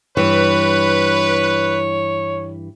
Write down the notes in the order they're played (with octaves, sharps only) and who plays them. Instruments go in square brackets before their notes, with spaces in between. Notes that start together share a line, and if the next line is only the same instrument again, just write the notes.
[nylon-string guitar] G2 E3 [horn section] B4 [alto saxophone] C#5